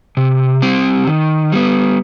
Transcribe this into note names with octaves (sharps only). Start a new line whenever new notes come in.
C3
G3 C4 G4
D#3
G3 B3